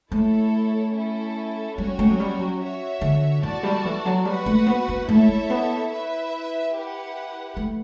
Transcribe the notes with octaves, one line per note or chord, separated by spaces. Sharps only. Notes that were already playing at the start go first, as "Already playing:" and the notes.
A3 E4 A4 C#5
C#4 E4 A4
G3 C#4 F#4 C#5 G5
A3
F#3
G3
F#3
F#4 C#5 E5
D3
E3 F#4 A4 D5 A5
G3
E3
F#3
G3 F#4 B4 F#5
A3
B3
B3
A3 E4 A4 C#5 E5
A3
B3
E4 B4 E5
E4 G4 B4 F#5
A3